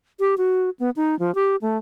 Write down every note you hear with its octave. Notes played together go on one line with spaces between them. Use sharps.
G4
F#4
B3
D#4
F3
G4
A3